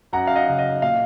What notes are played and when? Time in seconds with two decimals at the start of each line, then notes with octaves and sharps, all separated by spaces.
0.13 F#2 F#5 A#5
0.27 F5
0.36 D#5 F#5
0.48 C#3 F#3
0.59 D#5
0.82 A#2 F5